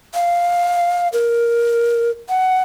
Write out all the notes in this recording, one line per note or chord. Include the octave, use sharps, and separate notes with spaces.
F5
A#4
F#5